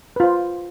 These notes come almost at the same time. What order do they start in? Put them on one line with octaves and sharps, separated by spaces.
B4 F4 C5